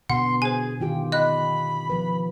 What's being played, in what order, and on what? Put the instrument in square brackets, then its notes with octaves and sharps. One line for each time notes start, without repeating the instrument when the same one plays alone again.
[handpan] B2 D3 B3 [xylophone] F#5 [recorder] C6
[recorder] G#4 [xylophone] C5 G#5
[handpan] D#3 F4 G4 [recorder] G5
[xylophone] D#5 F#6 [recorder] B5
[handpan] F3 B4